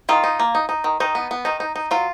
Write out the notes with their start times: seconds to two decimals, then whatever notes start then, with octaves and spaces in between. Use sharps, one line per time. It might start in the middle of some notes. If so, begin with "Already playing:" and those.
0.09 D#3 F4
0.24 D#4
0.40 A#3
0.55 D#4
0.69 D#4
0.84 D#3
1.00 D#3 D#4
1.15 B3
1.31 B3
1.45 D#3 D#4
1.60 D#4
1.76 D#4
1.91 F#3 F4